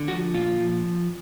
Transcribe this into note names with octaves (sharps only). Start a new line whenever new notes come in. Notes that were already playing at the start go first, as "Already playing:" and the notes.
Already playing: D3
F3 F#4
A#2 F4
F3